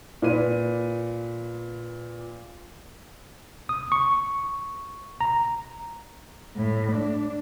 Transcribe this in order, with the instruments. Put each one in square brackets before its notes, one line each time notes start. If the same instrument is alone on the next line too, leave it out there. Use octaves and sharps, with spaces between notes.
[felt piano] A#2 B4 D#7
[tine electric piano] D#6
C#6
A#5
[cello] A2
D4